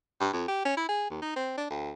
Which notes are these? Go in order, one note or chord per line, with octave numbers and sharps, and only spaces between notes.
G2
F2
G4
C#4
E4
G#4
D#2
D#4
C4
D4
D2